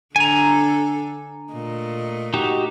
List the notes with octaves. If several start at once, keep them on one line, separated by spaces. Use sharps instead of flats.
D3 D4 A4 G#5 A#5
A#2 A3 D#5
D#4 F#4 G4